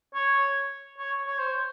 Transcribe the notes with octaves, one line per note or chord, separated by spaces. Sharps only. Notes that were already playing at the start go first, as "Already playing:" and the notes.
C#5
C#5
C#5
C5